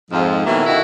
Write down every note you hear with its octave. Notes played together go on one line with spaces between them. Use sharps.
F2 G#2 F3
B2 D#3 E3 F#3 A3 A#3
F2 D3 D#3 E4 F#4